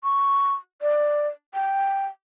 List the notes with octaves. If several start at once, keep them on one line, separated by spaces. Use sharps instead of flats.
C#6
D5
G5